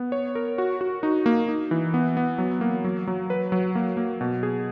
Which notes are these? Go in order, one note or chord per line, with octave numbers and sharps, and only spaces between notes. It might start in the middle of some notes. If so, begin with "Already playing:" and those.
Already playing: B3
C#5
A#4
F#4
F#4
D#4
A#3
D#4
E3
B3
B3
F#3
A#3
F#3
F#3
B4
F#3
A#3
A#3
B2
G#4